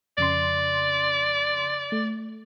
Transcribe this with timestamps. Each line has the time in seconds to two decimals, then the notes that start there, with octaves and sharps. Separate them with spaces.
0.18 F2 C#3 D5 C6
1.92 A3